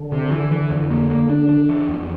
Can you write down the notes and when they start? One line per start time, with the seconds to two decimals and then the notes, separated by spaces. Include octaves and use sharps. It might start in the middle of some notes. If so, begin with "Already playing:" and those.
Already playing: D3
0.12 C3
0.31 E3
0.51 E3
0.71 F2
0.90 A#3
1.10 A#3
1.30 D4
1.49 D4
1.69 E3
1.88 F2